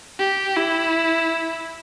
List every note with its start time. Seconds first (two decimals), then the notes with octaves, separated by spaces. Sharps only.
0.19 G4
0.56 E4